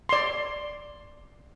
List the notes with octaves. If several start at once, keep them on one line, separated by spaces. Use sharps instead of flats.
D5 C6